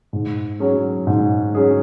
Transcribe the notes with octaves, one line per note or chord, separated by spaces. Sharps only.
G#2
F#3 C#4 G#4
G#2
F#3 C#4 G#4